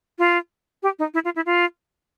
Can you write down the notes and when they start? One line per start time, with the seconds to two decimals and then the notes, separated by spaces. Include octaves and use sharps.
0.19 F4
0.83 G4
0.99 D#4
1.14 E4
1.25 F4
1.36 E4
1.46 F4